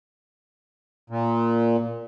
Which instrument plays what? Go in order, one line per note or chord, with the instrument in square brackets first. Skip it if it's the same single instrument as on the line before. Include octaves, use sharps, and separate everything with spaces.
[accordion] A#2